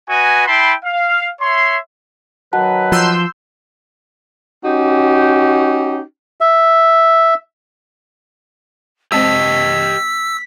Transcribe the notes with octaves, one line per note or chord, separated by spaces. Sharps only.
F#4 B4 D#5 G#5
E4 G5 A5 B5 C6
F5
C#5 E5 C6
D#3 F#3 F#4 B4 F#5 A5
F3 C6 E6 G6
C#4 D#4 F#4 G4
E5
G#3 C4 G4 C5 D#5 A5 E6 B6